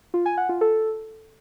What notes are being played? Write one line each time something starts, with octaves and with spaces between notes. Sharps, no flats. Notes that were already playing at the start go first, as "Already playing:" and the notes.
F4
G#5
F#5
F4
A4